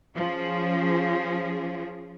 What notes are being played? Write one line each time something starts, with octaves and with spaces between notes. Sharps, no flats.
F3 C#4 G#4